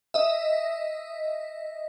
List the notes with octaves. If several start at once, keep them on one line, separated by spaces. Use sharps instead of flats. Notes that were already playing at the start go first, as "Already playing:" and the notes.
D#5 E5